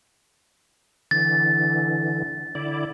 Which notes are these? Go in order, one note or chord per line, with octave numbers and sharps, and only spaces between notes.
D3 E3 A6
D3 E4 D5